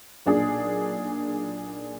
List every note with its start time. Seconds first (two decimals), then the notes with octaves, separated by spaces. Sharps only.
0.26 B1 A#2 D4 G#4